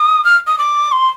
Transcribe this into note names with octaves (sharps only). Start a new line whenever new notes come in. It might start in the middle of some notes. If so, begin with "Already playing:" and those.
Already playing: D#6
F6
D#6
D6
C6